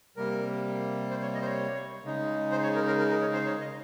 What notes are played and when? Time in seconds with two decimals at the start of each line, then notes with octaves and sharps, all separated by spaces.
0.17 C3 G3 A#3 A#4
1.10 C5
1.22 C#5
1.35 D#5
1.41 C5
1.46 C#5
2.04 C#3 G#3 D#4
2.51 C5
2.63 C#5
2.75 A#4
2.87 A#4
2.99 A#4
3.10 A#4
3.22 C#5
3.34 C5
3.46 C#5
3.61 D#5